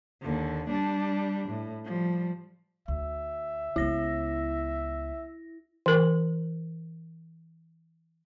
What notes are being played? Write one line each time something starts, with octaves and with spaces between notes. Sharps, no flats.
D#2 D3
G3 D4
A2
F3 G3
D2 E5
C#2 B3 E4 A#6
E3 A#4